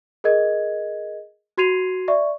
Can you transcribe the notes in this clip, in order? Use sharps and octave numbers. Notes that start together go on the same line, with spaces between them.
G#4 A#4 D#5 G#6
F#4 C6 G#6 C7 D#7 F7
D5 E5 C#6